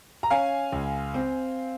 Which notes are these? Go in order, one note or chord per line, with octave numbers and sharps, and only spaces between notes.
A#5
C#4 F5 G#5
C#2
C4